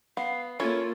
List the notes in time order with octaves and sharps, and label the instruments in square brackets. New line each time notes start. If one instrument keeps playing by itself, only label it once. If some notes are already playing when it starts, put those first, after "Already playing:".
[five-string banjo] B3 [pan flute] F5
[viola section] A#3 A4 [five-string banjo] C#4 E4 [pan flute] F4 [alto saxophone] C#5